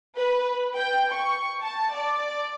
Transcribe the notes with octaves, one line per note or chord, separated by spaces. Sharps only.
B4
G5
C#6
A5
D5